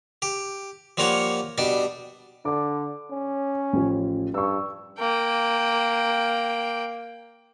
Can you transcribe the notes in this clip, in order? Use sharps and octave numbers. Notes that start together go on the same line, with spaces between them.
G4
F3 G3 A#3 F4 C#5 F#5
B2 G3 D4
D3 D6
C#4
A1 F3
G2 C#6 E6
A#3 G5